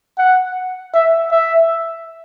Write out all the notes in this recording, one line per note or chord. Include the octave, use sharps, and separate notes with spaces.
F#5
E5
E5